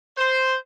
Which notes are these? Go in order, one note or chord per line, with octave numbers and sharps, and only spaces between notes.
C5